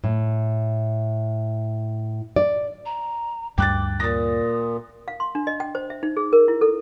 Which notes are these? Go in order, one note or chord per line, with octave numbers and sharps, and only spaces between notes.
A2
D5
A#5
D2 G2 G3 G5 D6 F#6 A6
A#2 D#6 A6 A#6
F5
C6
D4
D#5
G5
C5
E5
D#4
G#4
A#4
E4
A4